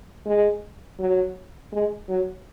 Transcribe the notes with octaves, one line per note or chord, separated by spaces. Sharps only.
G#3
F#3
G#3
F#3